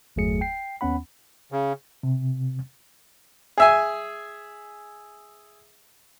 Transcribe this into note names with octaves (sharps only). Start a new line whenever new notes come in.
G1 E2 F#3 A3 G#4 C#7
G5 C7
D#2 B3 C#4 F#5 B5
C#3
C3
G#4 E5 G#5